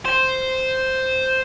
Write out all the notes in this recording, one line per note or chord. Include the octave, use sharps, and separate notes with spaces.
C5